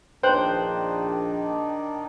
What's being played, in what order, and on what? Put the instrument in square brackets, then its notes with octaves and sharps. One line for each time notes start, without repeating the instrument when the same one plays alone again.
[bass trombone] A#1 [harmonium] D#3 D4 D#4 [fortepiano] C5 [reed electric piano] G5 F#6